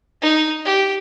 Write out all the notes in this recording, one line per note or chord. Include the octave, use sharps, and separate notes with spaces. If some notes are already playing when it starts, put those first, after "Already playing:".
D#4
G4